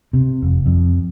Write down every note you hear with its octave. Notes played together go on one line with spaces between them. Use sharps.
C3
F1
F2